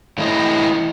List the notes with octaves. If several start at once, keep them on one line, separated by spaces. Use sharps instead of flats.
A2 E3 E4 D#5